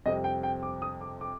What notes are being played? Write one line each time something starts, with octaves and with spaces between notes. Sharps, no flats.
F2 C3 G3 C4 D#5
G5
G5
D6
D#6
D6
D6